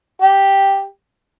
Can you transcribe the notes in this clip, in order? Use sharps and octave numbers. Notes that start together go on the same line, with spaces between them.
G4